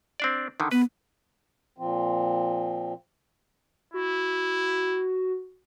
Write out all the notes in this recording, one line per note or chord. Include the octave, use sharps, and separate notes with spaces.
C4 D4 D5
D3 D#3
B3 B4
A#2 F3 C4
E4 F#4